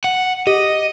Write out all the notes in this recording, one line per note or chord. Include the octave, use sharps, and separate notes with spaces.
F#5
G4 D#5